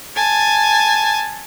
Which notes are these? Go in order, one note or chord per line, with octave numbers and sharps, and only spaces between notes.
G#5 A5